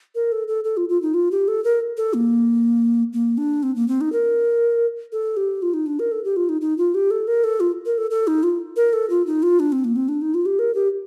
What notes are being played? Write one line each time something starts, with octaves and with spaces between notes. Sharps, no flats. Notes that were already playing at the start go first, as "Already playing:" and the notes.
A#4
A4
A4
A4
F4
F4
D#4
F4
G4
A4
A#4
A4
A#3
A#3
D4
C4
A#3
C4
D#4
A#4
A4
G4
F4
D#4
D4
A#4
A4
G4
F4
D#4
D#4
F4
G4
A4
A#4
A4
F4
A#4
A4
A4
D#4
F4
A#4
A4
F4
D#4
F4
D4
C4
A#3
C4
D4
D#4
F4
G4
A#4
G4